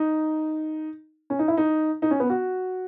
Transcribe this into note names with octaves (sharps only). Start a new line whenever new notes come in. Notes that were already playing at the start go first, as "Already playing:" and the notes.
Already playing: D#4
C#4
D#4
E4
D#4
D#4
C#4
B3
F#4